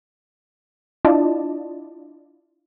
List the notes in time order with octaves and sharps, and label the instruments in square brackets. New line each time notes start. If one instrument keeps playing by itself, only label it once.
[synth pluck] D4 E4 F4 D5 D#5 A5